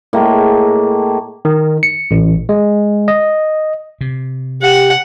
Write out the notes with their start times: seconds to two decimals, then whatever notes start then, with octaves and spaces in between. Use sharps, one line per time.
0.13 A2 G#3 A#3
1.45 D#3
1.83 C#7
2.11 A1
2.49 G#3
3.08 D#5
4.01 C3
4.62 G4 F#5